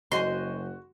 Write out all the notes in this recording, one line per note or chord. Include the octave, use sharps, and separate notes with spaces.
F#1 F#4 C5 D#5 G#5 C6